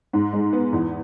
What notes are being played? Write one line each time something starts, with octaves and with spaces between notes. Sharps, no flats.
G#2
G#3
B3
E2